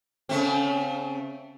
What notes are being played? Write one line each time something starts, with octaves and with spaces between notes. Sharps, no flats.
C#3 A3 C4